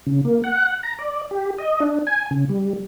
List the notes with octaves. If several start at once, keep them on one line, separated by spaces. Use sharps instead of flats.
C#3
A#3
F#5
A#5
D5
G4
D#5
D4
G#5
C#3
G3